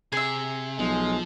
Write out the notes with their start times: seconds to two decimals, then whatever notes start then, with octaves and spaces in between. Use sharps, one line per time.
0.12 C3 G#4 E5
0.79 B1 F3 G#3